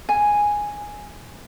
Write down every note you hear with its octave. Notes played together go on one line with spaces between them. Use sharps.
G#5